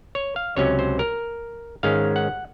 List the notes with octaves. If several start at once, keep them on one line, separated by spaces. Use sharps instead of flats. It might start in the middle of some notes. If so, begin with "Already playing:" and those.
C#5
F5
C#2 C3 F#3 C#4 C#5
C5
A#4
G#2 D#3 G#3 C#4 F5
F#5